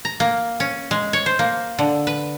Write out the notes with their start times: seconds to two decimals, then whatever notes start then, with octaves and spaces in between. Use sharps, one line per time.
0.05 A#5
0.20 A#3
0.60 C#4
0.91 G#3
1.13 C#5
1.26 C5
1.39 A#3
1.79 D3
2.07 B4